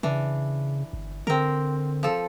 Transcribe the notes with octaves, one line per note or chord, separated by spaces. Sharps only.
C#3 E3 D4
G1
D3 C4 A#4
F3 A4